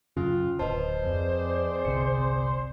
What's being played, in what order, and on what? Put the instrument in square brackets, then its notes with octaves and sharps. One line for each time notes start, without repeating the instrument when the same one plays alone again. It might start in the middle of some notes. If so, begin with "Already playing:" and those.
[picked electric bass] F#2 C#3 [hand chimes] C#4 [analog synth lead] F4
[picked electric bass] D1 [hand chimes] B4 D#5 A5 [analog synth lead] C5
[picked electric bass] F2 [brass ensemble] C4 G#4 D5
[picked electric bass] G1 C2 C3 [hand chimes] C#7